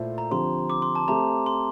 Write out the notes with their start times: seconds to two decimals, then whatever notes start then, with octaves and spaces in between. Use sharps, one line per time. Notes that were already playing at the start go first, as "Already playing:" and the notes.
Already playing: A#2 A3 E4 A4 C5
0.18 A#5
0.31 D3 F3 C4 G4 C5 C6
0.70 D6
0.82 C6
0.95 A5
1.08 A3 C4 G4 C5 A#5
1.46 C6